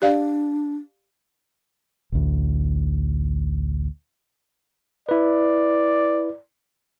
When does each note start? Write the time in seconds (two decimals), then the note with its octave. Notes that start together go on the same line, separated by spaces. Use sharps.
0.02 D4 G4 D5 F5
2.12 A1 D2
5.09 E4 B4 D5